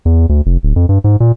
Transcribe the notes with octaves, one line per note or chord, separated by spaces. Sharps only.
E2
D2
F1
D1
F2
G2
G#2
A#2